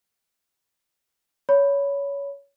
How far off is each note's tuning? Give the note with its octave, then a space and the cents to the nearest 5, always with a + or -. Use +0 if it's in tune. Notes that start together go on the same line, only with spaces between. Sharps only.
C#5 +20 B5 +0